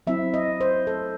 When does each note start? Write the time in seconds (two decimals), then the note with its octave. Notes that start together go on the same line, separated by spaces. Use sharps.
0.07 F#3 C4 E4 E5
0.34 D#5
0.61 C5
0.87 A4